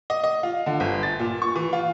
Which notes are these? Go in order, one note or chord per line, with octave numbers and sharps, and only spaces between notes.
D#5
D#5
F4
D3
G1
A6
A#2
C#6
E3
F4